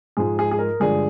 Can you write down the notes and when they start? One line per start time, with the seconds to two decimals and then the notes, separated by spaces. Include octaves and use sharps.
0.17 G#2 F3 G#3 G#4
0.39 G#4
0.51 G#4
0.59 A#4
0.80 G2 D3 F3 G#3 G#4